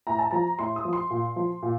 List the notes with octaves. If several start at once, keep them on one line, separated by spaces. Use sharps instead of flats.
A2 A#5
A5
F3 A#5
A2 C6
D#6
F3
C6
A#2
F3
A#2